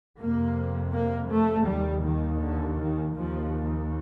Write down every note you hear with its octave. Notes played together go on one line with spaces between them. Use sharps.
F2 C3 A#3
A#3
A3
D#2 G3
D#3
D3
D#3
D#2 F3